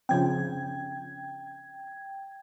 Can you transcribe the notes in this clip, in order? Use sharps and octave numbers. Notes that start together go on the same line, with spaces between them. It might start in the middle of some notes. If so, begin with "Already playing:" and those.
C#3 F3 C4 G5 G#6